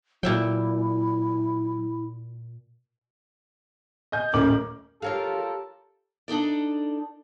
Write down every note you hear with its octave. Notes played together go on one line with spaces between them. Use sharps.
A#2 F#3 E4 E5 G5
D#5 G#5 G6
D#1 A1 C#4 A#4 D6 F#7
F4 G4 A4 A#4 C#5 F5
D4 D#4 A4 D5